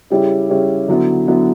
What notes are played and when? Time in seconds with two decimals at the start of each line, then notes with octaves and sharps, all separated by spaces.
0.10 C#3 G3 C#4 E4
0.50 C#3 G3 C#4 E4
0.88 D3 F#3 B3 E4
1.28 D3 F#3 B3 E4